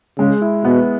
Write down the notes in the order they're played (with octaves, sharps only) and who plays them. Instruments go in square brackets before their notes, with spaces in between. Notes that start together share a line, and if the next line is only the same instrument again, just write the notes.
[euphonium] C#3 [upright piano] G#3
[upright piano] E4
[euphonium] B2 [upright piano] B3